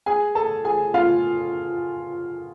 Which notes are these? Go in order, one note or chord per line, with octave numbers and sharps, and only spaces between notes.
G#4 G#5
A4 A5
G#4 G#5
F4 F5